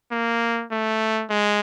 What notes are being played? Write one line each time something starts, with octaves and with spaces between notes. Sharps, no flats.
A#3
A3
G#3